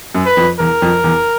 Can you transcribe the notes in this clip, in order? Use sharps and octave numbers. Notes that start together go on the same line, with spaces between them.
F#2
B4
F2
E2 A#4
F2
E2